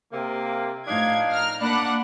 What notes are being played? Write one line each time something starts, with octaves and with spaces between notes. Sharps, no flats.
C3 A#3
A2 F3 D4 D#4 F5 G#6
A#5 F6
A#3 D4 F#5 B5 D6 F#6